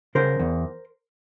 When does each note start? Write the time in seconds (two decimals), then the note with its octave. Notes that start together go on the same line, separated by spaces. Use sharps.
0.15 C#3 A#4 C5
0.39 E2